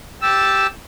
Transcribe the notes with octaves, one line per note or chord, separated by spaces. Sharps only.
G4 A5 E6